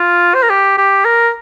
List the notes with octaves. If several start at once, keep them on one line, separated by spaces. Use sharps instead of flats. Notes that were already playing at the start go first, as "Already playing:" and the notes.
Already playing: F4
C5
A#4
G4
G4
A#4